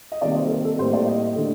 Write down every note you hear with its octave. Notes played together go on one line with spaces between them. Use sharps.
D#5
C3 D#3 G3 A#3 D5
C5
A4
A#4
A4
A2 G3 A#3 C5
D5
D#5
D3 A3